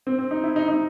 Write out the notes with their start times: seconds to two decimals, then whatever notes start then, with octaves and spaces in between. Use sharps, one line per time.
0.07 C4
0.19 C4
0.31 D#4
0.44 E4
0.56 D#4
0.68 D#4